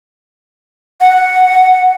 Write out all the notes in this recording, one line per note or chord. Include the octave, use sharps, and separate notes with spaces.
F#5